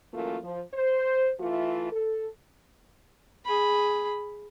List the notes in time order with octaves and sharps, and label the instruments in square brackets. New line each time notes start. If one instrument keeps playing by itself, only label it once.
[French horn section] F#2 E3 A3 A#3 F4
F3
C5
E3 A3 F4
A4
[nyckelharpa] G#4 B5